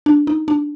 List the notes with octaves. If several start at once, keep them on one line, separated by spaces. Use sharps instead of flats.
D4
D#4
D4